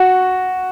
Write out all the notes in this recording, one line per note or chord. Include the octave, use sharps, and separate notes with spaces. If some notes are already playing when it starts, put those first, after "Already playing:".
Already playing: F#4